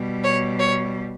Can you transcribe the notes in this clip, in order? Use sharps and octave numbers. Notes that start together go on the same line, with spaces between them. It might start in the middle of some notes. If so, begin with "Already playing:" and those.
Already playing: B2 G3
C#5
C#5